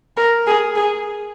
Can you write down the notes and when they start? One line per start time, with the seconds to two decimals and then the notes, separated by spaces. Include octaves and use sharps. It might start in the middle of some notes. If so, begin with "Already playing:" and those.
0.17 A#4
0.47 G#4
0.76 G#4